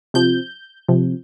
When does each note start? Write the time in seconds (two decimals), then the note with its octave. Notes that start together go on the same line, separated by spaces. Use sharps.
0.14 C3 F3 G6
0.88 C3 F3